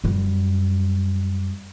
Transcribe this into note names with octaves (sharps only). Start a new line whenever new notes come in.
F#2 G3